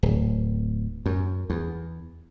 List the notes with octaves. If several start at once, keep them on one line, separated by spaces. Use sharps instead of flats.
D1
F#2
E2